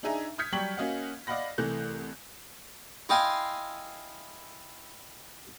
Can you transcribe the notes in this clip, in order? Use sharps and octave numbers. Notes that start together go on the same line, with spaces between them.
D4 D#4 G#4 E5 G#5 A#5
D#6 F6 G6 G#6 B6 C#7
F#3 G3 G4 C#6 B6 F#7
A#3 C#4 F#4 D#5 F5 F#5
D5 D#5 F5 F#5 B5 A#6
C2 E3 A3 F#6 G6
E4 D#5 F5 G5 G#5 C6